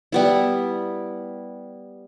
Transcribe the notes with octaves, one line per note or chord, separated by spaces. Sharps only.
G3 B3 E4